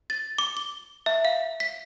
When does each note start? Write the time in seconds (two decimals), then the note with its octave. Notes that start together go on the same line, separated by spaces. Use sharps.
0.10 A6
0.38 D6
0.57 G7
1.06 E5
1.25 F5
1.60 B6